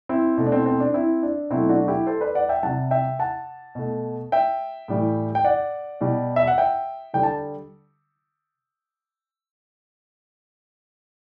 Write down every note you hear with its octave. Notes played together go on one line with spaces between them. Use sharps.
C4 E4
B2 A3
D4
C4
C4
D4
C4 E4
D4
B2 F#3 A3 C4 E4
D4 F#4
E4 G4
A4 C5
B4 D5
D5 F#5
E5 G5
C3 G3 F#5 A5
E5 G5
F#5 A5
B2 A3
E5 G5
A2 E3 G3
G5
D5 F#5
B2 G3
E5
F#5
E5 G5
D3 G3 G5
A5